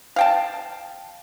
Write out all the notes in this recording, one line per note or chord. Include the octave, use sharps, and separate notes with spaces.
F5 G5 A5